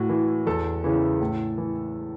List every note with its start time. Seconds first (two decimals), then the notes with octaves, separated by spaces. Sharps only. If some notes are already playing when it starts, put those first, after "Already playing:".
Already playing: A2 F#4
0.09 E3
0.46 E2 A4
0.84 C#3 E3
1.21 A2
1.58 E3